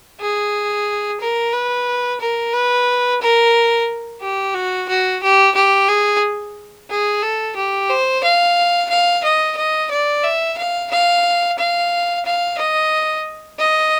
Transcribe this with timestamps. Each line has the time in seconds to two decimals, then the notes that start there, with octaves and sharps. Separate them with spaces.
0.20 G#4
1.21 A#4
1.53 B4
2.20 A#4
2.53 B4
3.22 A#4
4.21 G4
4.55 F#4
4.89 F#4
5.23 G4
5.55 G4
5.88 G#4
6.90 G#4
7.22 A4
7.56 G4
7.90 C5
8.24 F5
8.90 F5
9.23 D#5
9.57 D#5
9.91 D5
10.24 E5
10.58 F5
10.91 F5
11.58 F5
12.25 F5
12.58 D#5
13.59 D#5